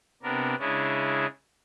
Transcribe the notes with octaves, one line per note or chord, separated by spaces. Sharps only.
C3 B3 D4 A#4
C#3 G#3 C#4 D4 E4